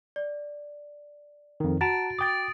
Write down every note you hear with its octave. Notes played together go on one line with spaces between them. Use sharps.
D5
F2 D#3
F#4 F#5 A5 A#5 A6 D7
G5 D6 D#6 A6